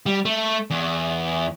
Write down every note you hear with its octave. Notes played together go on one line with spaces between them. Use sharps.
G3
A3
E2